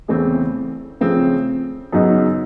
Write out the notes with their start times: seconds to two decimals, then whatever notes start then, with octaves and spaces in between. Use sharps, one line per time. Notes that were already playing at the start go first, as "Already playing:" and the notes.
0.08 E2 C#3 E3 A3 C4
1.01 C#3 F3 A3 C4
1.92 F#2 C#3 F#3 B3 D#4